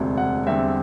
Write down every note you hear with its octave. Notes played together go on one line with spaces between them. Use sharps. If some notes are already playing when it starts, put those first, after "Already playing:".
Already playing: E1 D2 C3
F#5
E2 D3 G3 C4 E5